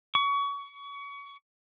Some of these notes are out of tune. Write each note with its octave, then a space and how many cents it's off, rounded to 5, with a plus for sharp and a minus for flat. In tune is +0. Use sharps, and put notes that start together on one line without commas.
C#6 +30